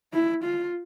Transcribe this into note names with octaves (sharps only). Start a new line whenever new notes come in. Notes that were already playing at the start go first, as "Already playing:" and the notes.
E4
F4